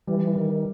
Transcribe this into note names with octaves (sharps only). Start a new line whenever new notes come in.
E3 G3
D#3